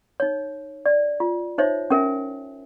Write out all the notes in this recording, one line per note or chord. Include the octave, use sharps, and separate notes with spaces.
D#4 C#5
D5
F4
D#4 C5 C#5 E5
C#4 A#4 E5 G#5